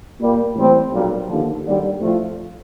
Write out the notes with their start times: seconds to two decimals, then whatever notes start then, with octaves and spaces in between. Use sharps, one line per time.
0.20 A#2 G3 A#3
0.55 A2 E3 G3 C4
0.92 B1 A#2 G3
1.27 D#2 D3 F3
1.64 D#2 D3 G3
1.99 A2 F3 A3 C4 F4